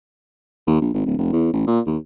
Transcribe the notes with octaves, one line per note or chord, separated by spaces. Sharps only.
D#2
A#1
G#1
D1
F1
E2
A1
A#2
D#2